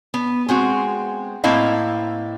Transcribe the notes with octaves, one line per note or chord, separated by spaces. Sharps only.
B3
G#3 C4 F#4
A2 A#3 C4 E4 D#5 F5